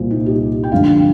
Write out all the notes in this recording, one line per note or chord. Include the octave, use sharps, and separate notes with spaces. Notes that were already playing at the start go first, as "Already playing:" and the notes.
Already playing: C2 A#2 G3 F4 A#4 C5
D#4
G4
G5
G2 D3 F3 F5